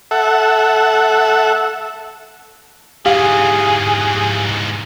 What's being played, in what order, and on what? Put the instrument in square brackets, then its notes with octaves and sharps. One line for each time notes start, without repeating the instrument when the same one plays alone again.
[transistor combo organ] A4 E5 F#5
[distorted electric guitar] G#2 E3 [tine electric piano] G4 [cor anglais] G#4 [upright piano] F5